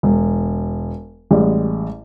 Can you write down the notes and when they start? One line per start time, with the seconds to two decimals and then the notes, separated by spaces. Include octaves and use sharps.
0.03 E1
1.31 A1 G3 G#3